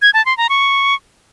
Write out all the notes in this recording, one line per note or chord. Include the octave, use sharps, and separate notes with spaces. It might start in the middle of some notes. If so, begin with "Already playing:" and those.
G#6
A5
C6
A#5
C#6